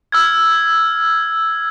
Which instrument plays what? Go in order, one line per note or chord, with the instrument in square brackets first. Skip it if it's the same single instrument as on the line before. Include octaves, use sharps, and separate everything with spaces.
[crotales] E6 F6 G#6